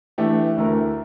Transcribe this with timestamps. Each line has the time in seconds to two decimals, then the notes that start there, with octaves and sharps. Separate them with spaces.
0.18 E3 A3 D4 G4
0.57 D2 D3 A3 E4 A#4